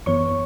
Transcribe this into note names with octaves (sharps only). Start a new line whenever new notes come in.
F#2 E3 B3 C#5 C#6